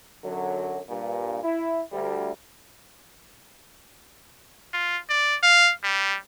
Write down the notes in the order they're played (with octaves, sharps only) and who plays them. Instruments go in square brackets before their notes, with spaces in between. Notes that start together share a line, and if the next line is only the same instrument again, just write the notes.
[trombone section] F#2 D3 F#3
G2 A#2
E4
D2 G3
[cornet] F4
D5
F5
G3